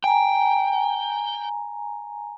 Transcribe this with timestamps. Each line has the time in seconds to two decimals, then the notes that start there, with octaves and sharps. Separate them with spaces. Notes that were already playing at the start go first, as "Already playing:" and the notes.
0.04 G5 G#5 A#5